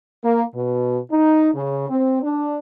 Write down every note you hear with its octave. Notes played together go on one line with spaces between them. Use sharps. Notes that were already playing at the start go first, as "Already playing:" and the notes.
A#3
B2
D#4
C#3
C4
D4